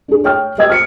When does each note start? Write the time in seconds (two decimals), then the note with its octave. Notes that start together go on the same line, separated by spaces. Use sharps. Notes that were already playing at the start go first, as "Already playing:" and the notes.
0.08 D4 G#4
0.24 C#5 G5 F6
0.58 C5 D#5 G5 E6 G#6
0.70 F6 C#7 D7